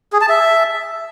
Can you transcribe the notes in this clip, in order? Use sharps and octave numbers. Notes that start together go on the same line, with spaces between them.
G#4
A5
E5